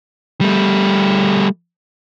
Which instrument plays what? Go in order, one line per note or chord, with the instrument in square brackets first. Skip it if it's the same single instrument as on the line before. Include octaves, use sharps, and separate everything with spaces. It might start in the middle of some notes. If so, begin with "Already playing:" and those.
[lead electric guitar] G3 A3